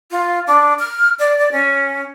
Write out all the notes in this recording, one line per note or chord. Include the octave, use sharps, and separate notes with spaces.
F4
D4
F6
D5
D5
C#4